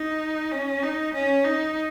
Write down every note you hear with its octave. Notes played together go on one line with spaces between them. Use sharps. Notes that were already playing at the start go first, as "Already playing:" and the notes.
Already playing: D#4
C#4
D#4
C#4
D#4